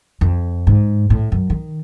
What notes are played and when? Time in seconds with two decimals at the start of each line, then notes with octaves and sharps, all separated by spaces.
0.21 F2
0.67 G#2
1.10 A2
1.32 F#2
1.50 D#3